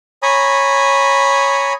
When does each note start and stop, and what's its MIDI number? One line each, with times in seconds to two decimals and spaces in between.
0.23 1.73 73
0.23 1.73 80
0.23 1.73 82
0.23 1.73 83
0.23 1.73 87